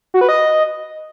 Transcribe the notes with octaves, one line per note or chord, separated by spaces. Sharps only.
F#4
B4
D#5